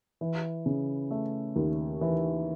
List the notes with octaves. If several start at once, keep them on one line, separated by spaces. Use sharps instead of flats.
E3
C#3
A3
D#2
E3